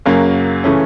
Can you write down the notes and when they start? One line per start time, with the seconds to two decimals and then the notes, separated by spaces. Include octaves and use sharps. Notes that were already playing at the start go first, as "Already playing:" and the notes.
0.05 F#2 C#3 F#3 A#3
0.64 C#3 E3 A3 C#4